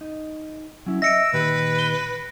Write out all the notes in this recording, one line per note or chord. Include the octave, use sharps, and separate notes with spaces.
D#4
F#3 C#4 E4
D#5 E5 E6 A#6 C#7 D7
A#2 D#3 G4 B4
G7